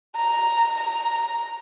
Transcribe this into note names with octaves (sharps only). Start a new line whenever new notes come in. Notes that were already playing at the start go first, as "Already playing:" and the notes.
A#5
A#5